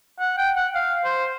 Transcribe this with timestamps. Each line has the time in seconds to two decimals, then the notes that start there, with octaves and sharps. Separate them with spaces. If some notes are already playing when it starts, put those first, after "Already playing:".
0.19 F#5
0.37 G5
0.56 F#5
0.75 F5
1.04 C5